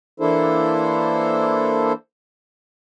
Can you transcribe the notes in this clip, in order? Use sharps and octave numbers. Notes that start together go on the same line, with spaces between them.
E3 A#3 D4 E4 A4 C5